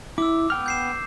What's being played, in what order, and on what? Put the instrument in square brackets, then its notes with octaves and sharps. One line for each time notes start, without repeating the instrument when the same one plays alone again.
[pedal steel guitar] E4 [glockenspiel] D6 E6
[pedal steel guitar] B3 G5 F6
[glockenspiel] G6 C7 E7